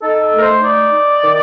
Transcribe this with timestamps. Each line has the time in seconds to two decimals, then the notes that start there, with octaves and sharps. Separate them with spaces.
0.01 D#4 A4
0.22 A4
0.32 A3
0.37 A#4
0.42 C5
0.62 D#4 D5
0.92 D#4
1.23 D#3